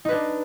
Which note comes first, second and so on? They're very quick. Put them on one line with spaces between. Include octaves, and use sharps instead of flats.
D#4 B4 D4